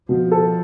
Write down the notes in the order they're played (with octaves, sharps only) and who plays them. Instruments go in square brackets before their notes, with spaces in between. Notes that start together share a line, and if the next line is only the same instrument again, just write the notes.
[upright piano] B2 [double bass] F3
[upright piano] A4